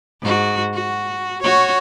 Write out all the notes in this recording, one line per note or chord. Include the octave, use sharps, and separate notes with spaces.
G#2 F#4
F#4
F#4 C#5